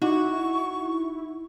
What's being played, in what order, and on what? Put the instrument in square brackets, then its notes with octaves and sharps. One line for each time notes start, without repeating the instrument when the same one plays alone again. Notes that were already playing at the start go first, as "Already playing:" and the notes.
[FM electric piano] D#4 [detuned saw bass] E4 [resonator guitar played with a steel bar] F#4 [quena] C#6